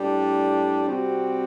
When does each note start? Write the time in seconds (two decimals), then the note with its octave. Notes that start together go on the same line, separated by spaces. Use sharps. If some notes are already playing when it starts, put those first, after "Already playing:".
Already playing: A2 G3 D4
0.86 C3 G3 C4 F#4